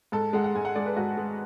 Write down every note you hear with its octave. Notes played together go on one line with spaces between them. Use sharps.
G#2 A4
G#3 F#5
F#5
G#2 G#5
F#5
G#3 D5
B4
G#2 F#4
G#3